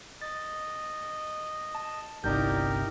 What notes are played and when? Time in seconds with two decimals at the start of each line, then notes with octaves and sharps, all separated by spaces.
0.21 D#5 A6
1.75 A5
2.24 G1 C2 D#4 E4 G4 A#4 D5 G6